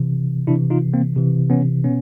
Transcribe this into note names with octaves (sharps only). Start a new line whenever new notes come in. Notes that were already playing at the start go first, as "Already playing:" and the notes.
Already playing: C3 E3
C3 E3 D4 E4
D#4 F4
A#3 C4
C3 E3
B3 C#4
B2 B3 C#4